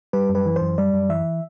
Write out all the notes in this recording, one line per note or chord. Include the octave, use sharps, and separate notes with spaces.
G3 B4
F#2
B4
E3
C5
F#2
G3 D5
F#2
E3 E5